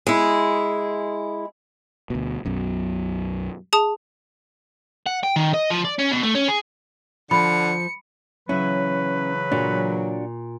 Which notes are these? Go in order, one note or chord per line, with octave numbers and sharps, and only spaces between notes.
G#3 E4
D2 B2
B1 F#2 B2
G#4 A5 D#6
F#5
G5
D#3
D#5
F3
D5
C#4
B2
A3
C#4
G#4
D3 F3 B5 C#7
C#3 E3 F#3 C#4 E4 B4
A#2 D4 F#4